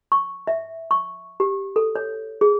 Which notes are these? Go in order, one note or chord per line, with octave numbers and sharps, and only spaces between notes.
C#6
E5
C#6
G4
A4
C#5
G#4